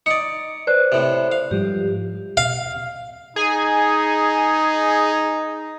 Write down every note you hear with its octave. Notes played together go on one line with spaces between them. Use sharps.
D#4 D5 C#7
B4 C5 D5 F#6
A2 C3
F5
G#2 F3 G3 G4
F5
D#4 G#4 G#5